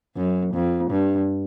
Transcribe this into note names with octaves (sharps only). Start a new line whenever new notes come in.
F#2
F2
G2